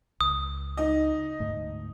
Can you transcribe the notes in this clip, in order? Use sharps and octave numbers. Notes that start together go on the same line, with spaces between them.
C#2 D#6
D#4 D#5
D2 G#2 A3